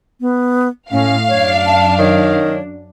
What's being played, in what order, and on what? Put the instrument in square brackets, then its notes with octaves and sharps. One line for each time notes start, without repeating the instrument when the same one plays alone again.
[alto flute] B3
[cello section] A2 A3 [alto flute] C#4 [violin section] F5
[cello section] F#2 D4 [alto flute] C#5
[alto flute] A5
[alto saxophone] D#3 [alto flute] C#5